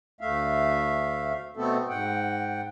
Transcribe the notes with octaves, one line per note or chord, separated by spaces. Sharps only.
D2 A3 E5 F5
B2 A3 B3 C4 A4
G#2 F#5 G5